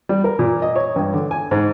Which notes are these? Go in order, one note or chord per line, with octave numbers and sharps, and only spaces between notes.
G3
A#4
A#2
D#5
C#5
G2
D3
G#5
G#2